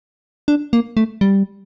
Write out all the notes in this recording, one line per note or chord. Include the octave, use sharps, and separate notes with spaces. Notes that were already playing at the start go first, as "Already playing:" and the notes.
D4
A#3
A3
G3